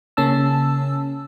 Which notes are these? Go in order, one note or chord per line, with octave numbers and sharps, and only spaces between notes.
C#3 A#3 C#4 A5 E6